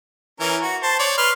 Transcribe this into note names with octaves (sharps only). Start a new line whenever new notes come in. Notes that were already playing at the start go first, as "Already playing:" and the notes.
E3 C#4 A#4
F#4
C5 A5
C#5 D5
B4 C6 F6